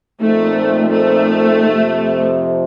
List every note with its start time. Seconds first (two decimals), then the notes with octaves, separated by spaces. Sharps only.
0.20 A#2 F3 A3 C4 D#4
0.92 A3
1.65 F2 C3 F3